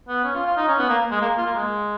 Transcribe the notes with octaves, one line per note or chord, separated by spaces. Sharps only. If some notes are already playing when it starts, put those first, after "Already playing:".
B3
C#4
F4
F4
D#4
C#4
B3
A#3
G#3
A#3
F4
A#3
G#3